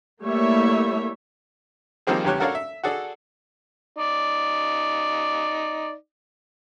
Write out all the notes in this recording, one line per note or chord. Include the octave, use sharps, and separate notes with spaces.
G3 A3 A#3 E4 C#5 E5
D#3 F3 G3 A#3 C4 G#4
E2 C#3 G3 G4 C#5 F#6
F#4 A4 A#4 C#5 D5 F5
E5
F#4 G#4 A4 D5
D#4 D5